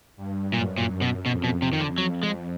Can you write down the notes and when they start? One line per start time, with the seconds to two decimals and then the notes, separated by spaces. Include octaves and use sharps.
0.16 G2
0.53 F#2 A#2
0.78 A#2
1.02 B2
1.25 F2 B2
1.44 B2
1.62 C3
1.73 D#3
1.80 D3
1.98 F2 F#3
2.23 G#3